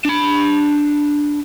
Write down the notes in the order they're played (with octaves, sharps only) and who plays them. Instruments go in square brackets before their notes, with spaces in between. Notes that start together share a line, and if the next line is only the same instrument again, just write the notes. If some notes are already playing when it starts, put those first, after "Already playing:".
[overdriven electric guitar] D4 B5